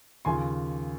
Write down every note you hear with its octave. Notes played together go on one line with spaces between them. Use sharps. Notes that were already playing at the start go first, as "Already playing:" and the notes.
D#2 C#3 F3 G#5 C6